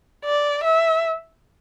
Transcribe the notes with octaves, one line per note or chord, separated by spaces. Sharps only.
D5
E5